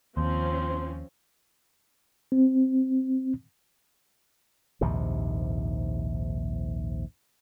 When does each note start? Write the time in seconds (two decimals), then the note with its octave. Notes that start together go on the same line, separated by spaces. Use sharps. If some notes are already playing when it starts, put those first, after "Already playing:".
0.17 D#2 F3 C4 C#4 C5
2.32 C4
4.81 A#1 D#2 G#2 C3